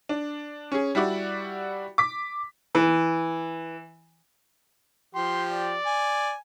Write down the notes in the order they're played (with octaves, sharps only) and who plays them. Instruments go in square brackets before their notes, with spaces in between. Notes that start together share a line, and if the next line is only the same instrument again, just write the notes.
[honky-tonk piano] D4
C#4 G#4
G3 E4 F#4 D5
D6 B6
[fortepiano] E3
[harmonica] F3 G4 [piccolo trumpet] C6
[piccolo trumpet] D5
[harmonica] G#5